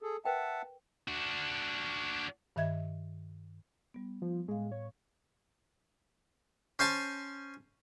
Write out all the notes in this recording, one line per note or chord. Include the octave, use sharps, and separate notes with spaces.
G#4 A4
A#4 B4 E5 F#5 G5 A5
D4 F#4
G2 D#3 D#5 E5 G#6
G3 B3
F3
A2 G#3 F5
C#5
C#4 C5 G#5 A5